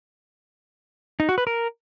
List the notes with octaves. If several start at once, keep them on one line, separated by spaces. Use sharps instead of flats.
D#4
F#4
B4
A#4